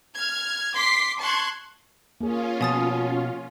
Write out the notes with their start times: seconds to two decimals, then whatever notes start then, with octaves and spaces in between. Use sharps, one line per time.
0.16 F6 G#6
0.75 C6 D6 B6 C7
1.20 A5 C6 C#6 F#6 G#6
2.21 A#3 C#4 F4 G#4
2.61 B2 F3 G#5 D#6 A6